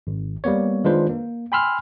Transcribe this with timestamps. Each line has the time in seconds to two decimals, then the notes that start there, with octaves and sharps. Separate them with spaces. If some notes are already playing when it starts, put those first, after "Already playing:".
0.07 G#1
0.44 G3 A#3 B3 C#5
0.84 D#3 G#3 D4 F4 B4 C5
1.09 A#3
1.52 G5 G#5 B5 C6 E6 F6